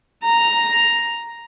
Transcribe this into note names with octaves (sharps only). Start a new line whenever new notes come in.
A#5